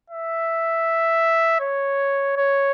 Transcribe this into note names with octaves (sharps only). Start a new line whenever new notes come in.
E5
C#5
C#5